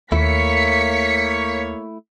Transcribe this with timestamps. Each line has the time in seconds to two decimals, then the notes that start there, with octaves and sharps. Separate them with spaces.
0.12 D#2 A3 A#3 E4 C#5 B6 C#7